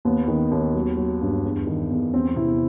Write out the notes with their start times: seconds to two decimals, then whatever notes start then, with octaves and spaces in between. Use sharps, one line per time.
0.05 D#2 B3
0.28 D#3
0.51 D#2
0.74 F#3
0.97 F#3
1.21 G2
1.44 E2
1.67 D#3
1.91 E2
2.14 E2 C4
2.36 C3 E4